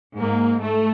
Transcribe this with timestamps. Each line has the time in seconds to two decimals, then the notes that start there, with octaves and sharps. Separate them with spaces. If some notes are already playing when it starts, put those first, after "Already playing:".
0.16 G#2 A#3
0.62 A3